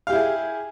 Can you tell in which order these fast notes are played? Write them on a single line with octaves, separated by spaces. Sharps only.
F5 G4 E4 G#4